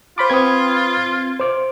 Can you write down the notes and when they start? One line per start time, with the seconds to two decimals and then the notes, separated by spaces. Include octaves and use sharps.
0.18 F4 C5 B5 D6
0.30 C4 B4 B5 D#6 G#6
1.40 C5 D6